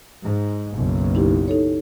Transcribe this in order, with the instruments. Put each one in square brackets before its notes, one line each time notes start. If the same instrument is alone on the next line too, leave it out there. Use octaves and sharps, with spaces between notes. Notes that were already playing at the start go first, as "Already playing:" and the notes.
[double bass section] G#2
F#1 B1
[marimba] D#4 E4 G4
D#4 A4 C#5